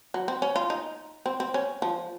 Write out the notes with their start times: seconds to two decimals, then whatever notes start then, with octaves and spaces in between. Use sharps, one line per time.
0.14 F#3
0.28 C4
0.42 C#4
0.56 F4
0.70 D#4
1.26 C4
1.40 C4
1.54 C#4
1.82 F3